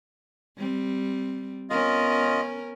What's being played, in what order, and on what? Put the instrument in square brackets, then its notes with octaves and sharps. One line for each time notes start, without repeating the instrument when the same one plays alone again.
[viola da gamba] G3 C4
[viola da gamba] B3 C#4 A#4 [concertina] F4 D#5